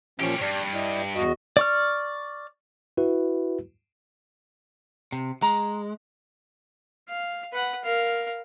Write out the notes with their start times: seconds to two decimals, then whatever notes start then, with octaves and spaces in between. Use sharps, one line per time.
0.20 A#2 F3 C#4 G4 C#5
0.42 G2 D5
0.74 E4 D5 D#5
1.15 E2 F#4 D#5
1.57 D5 C#6 F6
2.97 E4 F#4 B4
5.12 C3
5.42 G#3 A#5
7.09 F5
7.53 B4 F#5
7.84 A#4 F5